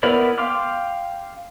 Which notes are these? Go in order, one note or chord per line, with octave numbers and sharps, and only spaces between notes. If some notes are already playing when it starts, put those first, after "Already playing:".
B3 E4 A#4 D5 B5
F5 G5 C6 D6 F6